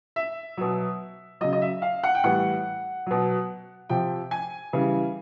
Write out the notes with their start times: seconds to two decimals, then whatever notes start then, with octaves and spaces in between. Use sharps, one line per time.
0.16 E5
0.57 B2 F#3
1.41 C#3 F#3 D#5
1.53 D#5
1.62 E5
1.82 F5
2.04 F#5
2.15 G5
2.23 A2 E3 G3 F#5
3.06 B2 F#3
3.89 C3 F3 G5
4.31 G#5
4.73 C#3 E3 G3